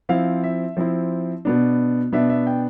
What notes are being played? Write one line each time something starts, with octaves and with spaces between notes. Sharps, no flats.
F3 C4 E4 F5
E5
F3 C4 E4
B2 B3 D4
B2 B3 D4 E5
E5
G5